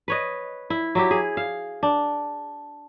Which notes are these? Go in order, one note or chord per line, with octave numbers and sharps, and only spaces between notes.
B4 C#5 D#5
E4
F#3 E4 G4
G#4
F5
D4